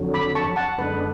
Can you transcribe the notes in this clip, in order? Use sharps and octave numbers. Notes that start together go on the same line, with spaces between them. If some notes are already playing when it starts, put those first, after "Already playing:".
Already playing: F2 D3 F#3
B5 D6
A5 C#6
F#5 A5
F#2 D3 G#3 B3 D4 B4